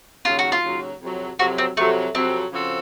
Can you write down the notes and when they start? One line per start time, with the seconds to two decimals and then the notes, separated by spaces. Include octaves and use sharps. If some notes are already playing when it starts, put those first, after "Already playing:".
0.25 D#2 C#3 F#3 F4
0.39 F#4
0.52 F4
0.63 D#2 C#3 F#3
1.02 F2 C3 F#3
1.39 F2 C3 F#3 F#4
1.58 C4
1.77 F2 C3 F#3 A3
2.15 F2 C3 F#3 C4
2.53 C#3 F3 C4 F#4 A4